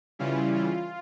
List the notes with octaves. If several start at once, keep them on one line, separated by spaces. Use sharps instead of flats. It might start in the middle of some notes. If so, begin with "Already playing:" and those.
C#3 E3 G3 C#4 E4 F4
F4